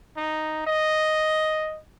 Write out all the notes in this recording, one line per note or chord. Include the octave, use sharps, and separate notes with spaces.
D#4
D#5